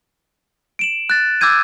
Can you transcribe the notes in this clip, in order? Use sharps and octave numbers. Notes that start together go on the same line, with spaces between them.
D7 E7 F#7
F#6 A6
D6 E6 G6 G#6 D#7